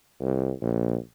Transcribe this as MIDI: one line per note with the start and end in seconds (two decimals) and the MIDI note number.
0.20 0.51 36
0.62 0.97 34